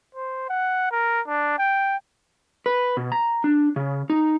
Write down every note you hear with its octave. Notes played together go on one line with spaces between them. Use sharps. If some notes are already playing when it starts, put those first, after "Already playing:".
C5
F#5
A#4
D4
G5
B4
B2
A#5
D4
C#3
D#4